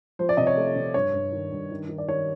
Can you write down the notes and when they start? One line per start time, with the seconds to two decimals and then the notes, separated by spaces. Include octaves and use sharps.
0.19 F3 C5
0.29 D5
0.37 C3 D#5
0.47 C#5
0.57 A3
0.76 C3
0.94 G2 C#5
1.14 G2
1.32 D#3
1.52 G2
1.71 D#3
1.89 D#3
1.98 D5
2.08 D#3 C#5